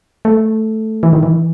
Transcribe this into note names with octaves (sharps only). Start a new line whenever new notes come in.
A3
E3
D#3
E3